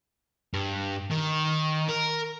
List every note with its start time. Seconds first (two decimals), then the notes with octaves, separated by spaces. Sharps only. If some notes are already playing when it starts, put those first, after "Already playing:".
0.54 G2
1.11 D#3
1.89 A#4